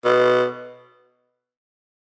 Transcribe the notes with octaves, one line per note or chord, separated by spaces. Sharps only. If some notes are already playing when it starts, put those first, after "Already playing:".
B2